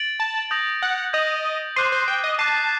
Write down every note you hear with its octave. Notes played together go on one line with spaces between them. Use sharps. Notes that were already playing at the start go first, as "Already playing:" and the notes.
Already playing: A6 D7 F#7
A5
D#6 G6 A#6 F#7
F#5
D#5 D#6 G6 A#6 F#7
C5 D6 F#6 C7 D#7
C5
G5
D#5
A5 D6 F#6 C7 D#7